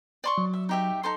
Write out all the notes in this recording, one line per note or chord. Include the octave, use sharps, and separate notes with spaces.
D5 C6 C#6
F#3
E5
D#4 G4 E5
D#4 A4 C6